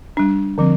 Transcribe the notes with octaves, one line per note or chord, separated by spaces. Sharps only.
G3 D4
D3 F3 C4